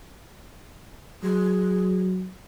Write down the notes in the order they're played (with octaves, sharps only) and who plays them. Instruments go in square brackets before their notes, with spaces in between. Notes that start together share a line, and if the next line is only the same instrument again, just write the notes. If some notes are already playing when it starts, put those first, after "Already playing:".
[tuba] F#3 [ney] G#4